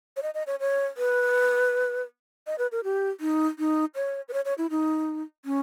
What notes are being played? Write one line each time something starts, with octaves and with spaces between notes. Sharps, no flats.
C#5
D#5
D#5
C#5
C#5
B4
D#5
B4
A#4
G4
D#4
D#4
C#5
B4
C#5
C#5
E4
D#4
C#4